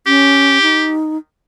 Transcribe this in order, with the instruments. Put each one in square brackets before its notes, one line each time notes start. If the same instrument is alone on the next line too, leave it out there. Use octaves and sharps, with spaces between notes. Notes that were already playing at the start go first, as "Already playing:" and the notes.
[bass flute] C#4 [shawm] G4
[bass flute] D#4